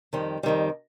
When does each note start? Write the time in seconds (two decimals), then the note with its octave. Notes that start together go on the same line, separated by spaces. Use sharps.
0.13 F2 D#3 G3
0.43 F2 D#3 G3